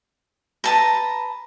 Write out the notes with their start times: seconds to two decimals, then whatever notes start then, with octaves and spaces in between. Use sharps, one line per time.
0.64 B4 A5 A#5